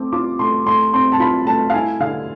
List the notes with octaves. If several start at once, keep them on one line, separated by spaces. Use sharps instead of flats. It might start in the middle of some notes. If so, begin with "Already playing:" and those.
Already playing: A3 C4 D6
F4 D6
A3 C6
A3 C6
C4 C6
A5
F4 B5
A3 A5
F5
E4 G#5
D3 F5